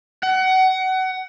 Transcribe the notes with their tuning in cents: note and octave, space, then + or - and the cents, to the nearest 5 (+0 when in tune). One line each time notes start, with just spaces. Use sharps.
F#5 +25